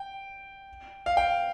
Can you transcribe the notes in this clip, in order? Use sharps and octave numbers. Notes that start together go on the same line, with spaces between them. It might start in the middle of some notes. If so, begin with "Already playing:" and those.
Already playing: G5
F5
G5